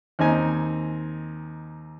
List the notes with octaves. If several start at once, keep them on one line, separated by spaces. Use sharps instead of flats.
D#2 C4 D#4 G#5